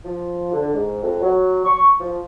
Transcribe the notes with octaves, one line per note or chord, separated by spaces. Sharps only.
F3
D3
G#2
F2
F#3
C#6
F3